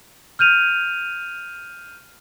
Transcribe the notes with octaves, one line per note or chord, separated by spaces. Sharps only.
F6 G6 D#7 F7